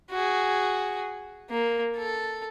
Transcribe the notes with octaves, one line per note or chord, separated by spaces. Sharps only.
F#4 G#4
A#3
A4